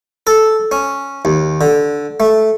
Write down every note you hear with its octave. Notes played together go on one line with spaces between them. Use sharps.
A4
C#4
D#2
D3
A3